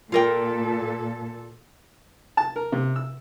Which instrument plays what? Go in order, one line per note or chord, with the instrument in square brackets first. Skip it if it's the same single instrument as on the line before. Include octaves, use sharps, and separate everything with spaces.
[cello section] A#2 A4 [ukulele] F4 A#4 G5
[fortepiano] A5
A#4
C3
E6